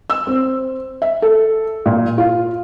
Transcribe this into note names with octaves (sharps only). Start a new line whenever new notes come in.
E6
C4
E5
A4
A#2
F4